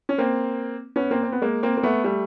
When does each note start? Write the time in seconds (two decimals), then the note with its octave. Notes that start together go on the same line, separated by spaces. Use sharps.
0.09 C#4
0.18 A#3 C4
0.96 B3 C#4
1.11 A#3 C4
1.23 C4
1.32 B3
1.42 G#3 A#3
1.63 A#3 C4
1.77 A#3
1.83 A3 B3
2.04 G3 A3